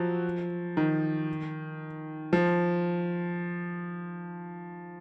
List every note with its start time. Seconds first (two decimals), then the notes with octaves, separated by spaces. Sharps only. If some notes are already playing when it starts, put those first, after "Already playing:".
Already playing: F3 F#3
0.77 D#3
2.33 F3